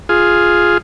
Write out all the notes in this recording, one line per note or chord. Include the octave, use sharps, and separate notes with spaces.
F4 G#4